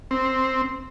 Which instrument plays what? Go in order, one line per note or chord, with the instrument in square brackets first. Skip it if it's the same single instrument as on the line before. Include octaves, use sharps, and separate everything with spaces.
[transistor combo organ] C4